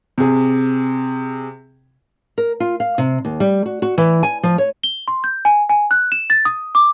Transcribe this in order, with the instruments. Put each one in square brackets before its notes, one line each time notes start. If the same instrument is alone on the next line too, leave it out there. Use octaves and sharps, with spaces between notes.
[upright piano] C3 G#4
[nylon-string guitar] A#4
F4
F5
C3
D#2
G3
F#4
F#4
E3
G#5
F3
C#5
[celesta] G7
C6
G6
G#5
G#5
F#6
E7
A6
D#6
D6